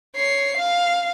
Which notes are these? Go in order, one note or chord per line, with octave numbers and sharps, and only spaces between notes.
C#5 C7
F5